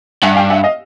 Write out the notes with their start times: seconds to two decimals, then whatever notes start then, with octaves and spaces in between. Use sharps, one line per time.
0.22 G2 E5 F#5
0.36 F5 G5
0.50 E5 F#5
0.63 D#5 F5